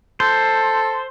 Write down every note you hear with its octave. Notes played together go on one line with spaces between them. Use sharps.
A4 C5